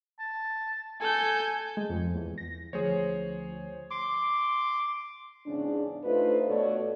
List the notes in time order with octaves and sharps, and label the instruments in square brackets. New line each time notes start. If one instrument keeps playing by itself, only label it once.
[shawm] A5
[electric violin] A4 G6 [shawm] G#5
[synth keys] G#3
F2
E2
A#6
[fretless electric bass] D2 F3 [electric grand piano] G#4 C5 C#5
[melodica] C6 D6
[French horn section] E2 G#2 C#3 C#4 D4
A3 D4 D#4 F4 B4 C5
B2 A3 A4 C#5 D5